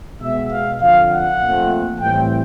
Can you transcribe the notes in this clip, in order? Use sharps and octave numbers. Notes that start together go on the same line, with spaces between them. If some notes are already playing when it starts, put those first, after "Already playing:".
B2 G#3 B3 E5
F5
F2 D3 F3 F5
F#5
A#2 F3 A3 C4
A2 E3 G3 C4 G5